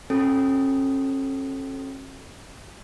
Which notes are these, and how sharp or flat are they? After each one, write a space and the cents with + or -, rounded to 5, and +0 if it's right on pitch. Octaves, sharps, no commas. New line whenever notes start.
C#4 -40 F#4 +0 A4 -15